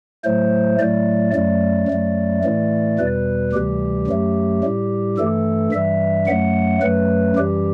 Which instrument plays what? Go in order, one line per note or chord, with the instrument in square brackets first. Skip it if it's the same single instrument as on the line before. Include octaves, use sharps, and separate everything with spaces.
[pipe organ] A2 F#3 A3 C5
A2 F#3 A3 D5
F#2 F#3 A3 D5
F#2 F#3 A3
A2 E3 A3
E2 B2 G3 B4
D2 C3 E3 G3 G4
F#2 F#3 A3
A2 G3
G2 E3 A3 A4
G2 E3 G3 E5
F#2 F#3 A3 F#5
F#2 F#3 A3 B4
F#2 E3 G3 G4